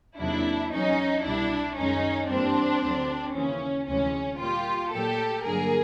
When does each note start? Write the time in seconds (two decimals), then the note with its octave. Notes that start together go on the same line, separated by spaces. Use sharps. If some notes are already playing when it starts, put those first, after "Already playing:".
0.18 E2 C3 D#3 F#3 A#3 D4 E4
0.71 E2 B2 F#3 C#4 D#4
1.24 C2 B2 G3 D4 E4
1.76 F#2 D#3 G#3 C#4 D#4
2.29 G2 E3 G3 A#3 C4 D4
2.82 D2 D3 F#3
3.34 D#2 C#3 E3 C#4
3.87 D2 C3 E3 G#3 C#4
4.39 A#2 G3 A#3 F4 G4
4.92 A#2 F#3 A3 G4 A4
5.44 G2 D3 F#3 A#3 G#4 A#4